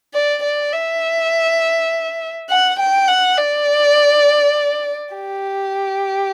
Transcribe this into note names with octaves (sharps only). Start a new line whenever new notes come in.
D5
D5
E5
F#5
G5
F#5
D5
G4